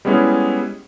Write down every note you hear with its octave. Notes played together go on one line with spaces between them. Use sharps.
G3 G#3 B3 C#4 E4 G#4